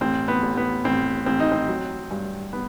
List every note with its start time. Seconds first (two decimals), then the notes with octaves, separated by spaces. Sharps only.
0.01 A1 C4
0.28 B3
0.42 A1
0.57 B3
0.84 A1 C4
1.26 A1 C4
1.40 D#4
1.52 C4
1.68 F#3
2.11 G2
2.53 B3